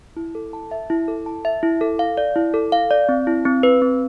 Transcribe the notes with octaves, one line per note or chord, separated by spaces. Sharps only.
E4
A4
A5
E5
E4
A4
A5
E5
E4
A4
F5
D5
E4
A4
F5
D5
C4
E4
C4
B4
C4